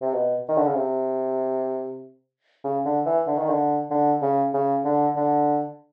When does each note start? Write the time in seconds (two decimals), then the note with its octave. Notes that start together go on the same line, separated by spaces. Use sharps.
0.02 C3
0.13 B2
0.49 D#3
0.57 D3
0.67 C#3
0.75 C3
2.64 C#3
2.85 D3
3.06 E3
3.27 D3
3.38 D#3
3.50 D3
3.91 D3
4.22 C#3
4.54 C#3
4.85 D3
5.16 D3